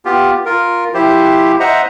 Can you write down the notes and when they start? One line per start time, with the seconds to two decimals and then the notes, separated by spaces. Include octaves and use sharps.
0.05 B3 F4 G4
0.46 F4 A#4
0.94 F3 E4 G4 C5
1.60 C5 D#5 E5 F#5 A#5